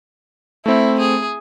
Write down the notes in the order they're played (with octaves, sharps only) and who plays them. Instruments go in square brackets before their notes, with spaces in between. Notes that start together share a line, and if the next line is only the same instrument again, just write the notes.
[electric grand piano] A3 C4 [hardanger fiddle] E4
[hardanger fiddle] G#4